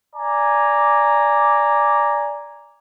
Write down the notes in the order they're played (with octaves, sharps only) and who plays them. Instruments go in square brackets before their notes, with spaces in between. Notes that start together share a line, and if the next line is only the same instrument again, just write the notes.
[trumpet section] D5 G#5 A#5